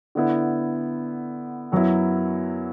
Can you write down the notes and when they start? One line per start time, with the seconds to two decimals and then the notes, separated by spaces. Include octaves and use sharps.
0.15 D3 B3 E4
1.72 F#2 F#3 B3 E4